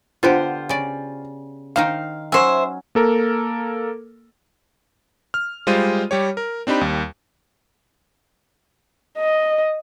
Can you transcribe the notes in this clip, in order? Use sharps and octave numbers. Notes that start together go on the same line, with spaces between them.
D3 B3 F4 G4 C5
C#3 D5
D#3 D#4 C5 F5
F#3 C#4 C5 E5
A#3 A4 A#4
F6
G3 G#3 F4 C5 D#7
G3 G4 C#5
A#4
C4 D4 D#4 G4 B5
D#2 G3
D#5